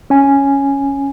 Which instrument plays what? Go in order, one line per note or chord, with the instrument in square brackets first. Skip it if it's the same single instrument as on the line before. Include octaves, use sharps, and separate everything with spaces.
[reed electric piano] C#4 G#5